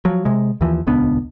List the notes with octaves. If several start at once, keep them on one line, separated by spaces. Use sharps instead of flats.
F3 F#3
C3 G#3
D#2 E3 F3
D#1 C#2 B3 D4